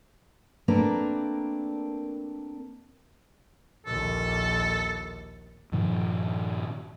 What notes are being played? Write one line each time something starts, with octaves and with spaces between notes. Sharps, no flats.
A3 A#3 C4 D4 A#4 B4
A#1 D#2 A4
G2 A#2 D#3 F3